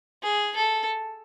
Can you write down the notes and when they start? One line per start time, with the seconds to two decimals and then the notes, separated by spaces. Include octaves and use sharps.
0.23 G#4
0.56 A4